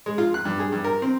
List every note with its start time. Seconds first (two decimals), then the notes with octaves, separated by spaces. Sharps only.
0.06 G#3
0.18 F4
0.34 F#6
0.45 G2
0.60 G#4
0.72 G2
0.84 A#4
1.02 C4